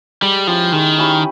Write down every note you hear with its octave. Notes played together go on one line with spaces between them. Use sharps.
G3 G#3
F3 C#4 E4 G4
D#3 G#3
C#4 E4 G4